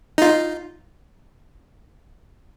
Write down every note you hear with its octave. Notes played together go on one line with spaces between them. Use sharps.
D#4 F4